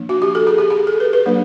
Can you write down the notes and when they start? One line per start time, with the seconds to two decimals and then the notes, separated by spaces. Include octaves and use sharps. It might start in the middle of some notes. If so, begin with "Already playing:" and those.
Already playing: F3 A#3 D4
0.09 F#4
0.22 G4
0.35 A4
0.47 G#4
0.58 G4
0.70 G#4
0.87 A4
1.00 B4
1.13 B4
1.26 F#3 A#3 D4